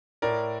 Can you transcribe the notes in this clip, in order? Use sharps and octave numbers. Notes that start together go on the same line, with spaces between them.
A2 A#4 D5